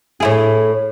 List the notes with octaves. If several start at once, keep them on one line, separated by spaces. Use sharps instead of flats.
A2 E4 G#4